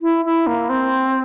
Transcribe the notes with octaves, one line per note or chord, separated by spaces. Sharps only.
E4
E4
A#3
C4